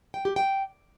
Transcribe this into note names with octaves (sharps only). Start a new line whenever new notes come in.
G5
G4
G5